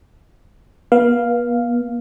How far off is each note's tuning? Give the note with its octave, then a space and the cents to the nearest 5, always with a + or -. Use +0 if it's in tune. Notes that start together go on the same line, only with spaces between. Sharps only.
B3 -40 F5 +0